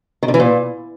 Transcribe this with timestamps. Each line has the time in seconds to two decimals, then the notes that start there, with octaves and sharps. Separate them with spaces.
0.23 D#3
0.28 D3
0.34 E3
0.40 A#2